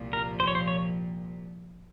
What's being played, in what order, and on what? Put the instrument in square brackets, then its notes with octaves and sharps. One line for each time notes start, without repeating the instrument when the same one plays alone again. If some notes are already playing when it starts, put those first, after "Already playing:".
Already playing: [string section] C2 A#2 F3
[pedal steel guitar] A#4
C5
C#5
C5
C#5